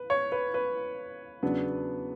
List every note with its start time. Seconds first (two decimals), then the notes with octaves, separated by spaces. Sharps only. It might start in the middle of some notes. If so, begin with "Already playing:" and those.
Already playing: B4
0.10 C#5
0.32 B4
0.54 B4
1.43 E2 C#3 F#3 B3 D4